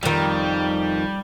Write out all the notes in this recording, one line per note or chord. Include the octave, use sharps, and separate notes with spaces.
F2 D#3 G3